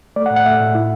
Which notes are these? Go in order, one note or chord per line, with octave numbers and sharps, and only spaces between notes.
A3 D5
F#5
A2
F#5
A3 E5
A2
E4